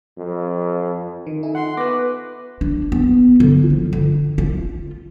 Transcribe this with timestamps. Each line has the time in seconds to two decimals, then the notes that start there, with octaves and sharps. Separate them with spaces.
0.18 F2
1.27 D#3
1.43 D#4 A4 E5 G#5
1.55 F4 F#5 C6
1.77 B3 B4 C#6 D6 F#6 A#6
2.61 D4
2.92 B3
3.40 D3
3.70 F3
3.93 D3
4.38 F4